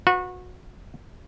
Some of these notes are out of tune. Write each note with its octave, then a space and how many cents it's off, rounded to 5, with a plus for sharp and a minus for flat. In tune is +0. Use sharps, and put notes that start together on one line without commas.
F#4 -30 B4 +0